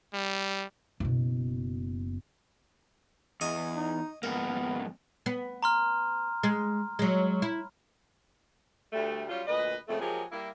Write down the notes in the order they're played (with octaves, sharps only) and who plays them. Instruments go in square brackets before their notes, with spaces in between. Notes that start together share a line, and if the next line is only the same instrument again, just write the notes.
[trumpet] G3
[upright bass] F#1 B2
[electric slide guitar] E2 [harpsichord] D#5 G#5 C#6
[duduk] D#4
[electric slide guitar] F2 G#2 A#3 [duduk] B3 [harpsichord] A#4
[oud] B3
[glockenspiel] A#5 C6 F6
[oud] G#3
F#3 G#3
E4
[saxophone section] D2 G3 A3
F#3 G3 C#4 F4
D2 A#2 B4 D#5
F2 A#2 C#3 F3 A3
F3 F#3 G#3 A#3 G4 G#4
G3 A#3 E4